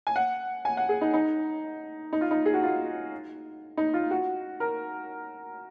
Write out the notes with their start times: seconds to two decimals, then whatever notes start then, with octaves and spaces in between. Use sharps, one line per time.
0.07 G#5
0.16 F#5
0.65 G#5
0.77 F#5
0.89 G#4
1.01 D#4
1.14 D#4
2.13 D#4
2.21 F4
2.31 D#4
2.46 G#4
2.54 F#4
2.63 F4
3.77 D#4
3.94 F4
4.11 F#4
4.60 A#4